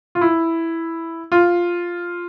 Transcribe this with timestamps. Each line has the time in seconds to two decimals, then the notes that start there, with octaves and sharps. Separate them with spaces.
0.15 F4
0.21 E4
1.32 F4